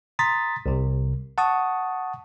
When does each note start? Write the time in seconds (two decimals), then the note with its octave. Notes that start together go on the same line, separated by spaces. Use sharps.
0.19 A#5 C6 D#6 A6 B6
0.66 C2 C3
1.38 F#5 A5 C#6 D#6